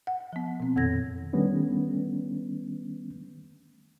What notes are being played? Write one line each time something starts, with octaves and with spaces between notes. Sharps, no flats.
F#5
F3 B3
B2 C4
F2 A#2 D#3 A4 G#6 A#6
D#3 G3 A3 B3 C#4 D4